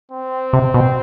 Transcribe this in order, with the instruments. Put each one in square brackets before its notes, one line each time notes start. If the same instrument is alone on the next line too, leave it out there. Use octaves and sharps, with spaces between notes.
[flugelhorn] C4
[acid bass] C3
B2